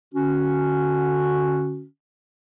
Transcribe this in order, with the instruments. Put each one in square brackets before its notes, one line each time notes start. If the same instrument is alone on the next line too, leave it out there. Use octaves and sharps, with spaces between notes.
[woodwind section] D3 C#4 F#4